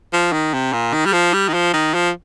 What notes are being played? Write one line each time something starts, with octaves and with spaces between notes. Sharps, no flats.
F3
D#3
C3
A#2
D#3
G3
F3
G3
D#3
F3
D#3
F3